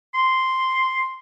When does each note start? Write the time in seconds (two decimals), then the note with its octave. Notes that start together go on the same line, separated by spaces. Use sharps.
0.15 C6